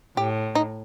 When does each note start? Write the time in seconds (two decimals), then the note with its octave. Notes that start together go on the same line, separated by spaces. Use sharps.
0.17 A2 G4
0.55 D#4